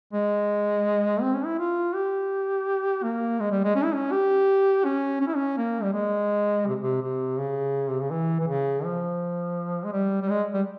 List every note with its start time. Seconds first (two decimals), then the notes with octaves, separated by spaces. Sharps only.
0.13 G#3
1.21 C4
1.34 C#4
1.45 E4
1.59 F4
1.95 G4
3.03 A#3
3.40 G#3
3.51 G3
3.64 G#3
3.75 C#4
3.84 E4
3.94 C#4
4.12 G4
4.85 C#4
5.21 C#4
5.27 E4
5.36 C#4
5.58 A#3
5.82 G3
5.93 G#3
6.67 C3
6.81 C3
7.02 C3
7.39 C#3
7.90 C3
8.01 C#3
8.11 E3
8.40 E3
8.47 C#3
8.84 F3
9.85 G#3
9.93 G3
10.22 G3
10.30 G#3
10.54 G3